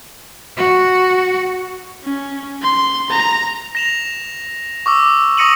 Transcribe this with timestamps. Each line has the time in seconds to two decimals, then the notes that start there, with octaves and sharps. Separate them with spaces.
0.57 F#4
2.04 C#4
2.62 C6
3.10 A#5
3.75 A#6 E7 F7
4.86 C#6 D6 E6
5.37 C#6 D#6 A#6 C#7 D#7 F#7